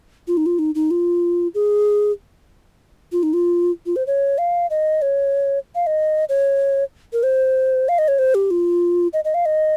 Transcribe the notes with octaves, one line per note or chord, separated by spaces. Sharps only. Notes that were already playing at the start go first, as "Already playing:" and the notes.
F4
D#4
F4
D#4
D#4
F4
G#4
F4
D#4
F4
F4
C5
C#5
F5
D#5
C#5
F5
D#5
C#5
A#4
C5
F5
D#5
C#5
C5
G4
F4
D#5
D#5
F5
D#5